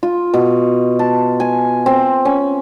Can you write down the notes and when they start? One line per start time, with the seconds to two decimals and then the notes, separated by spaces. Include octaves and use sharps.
0.03 F4
0.34 B2
0.99 A5
1.40 G#5
1.86 C4
2.25 C#4